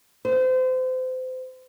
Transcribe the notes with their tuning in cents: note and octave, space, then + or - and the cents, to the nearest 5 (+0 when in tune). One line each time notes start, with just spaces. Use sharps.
C5 -30